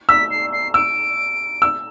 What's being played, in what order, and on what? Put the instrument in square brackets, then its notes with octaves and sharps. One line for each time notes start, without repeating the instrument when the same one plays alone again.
[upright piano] E6 [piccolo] B6
[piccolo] C7
C7
[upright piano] E6 [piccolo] D7
[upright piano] E6